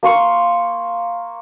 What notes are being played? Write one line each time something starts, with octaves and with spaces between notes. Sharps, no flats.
A#3 C6 C#6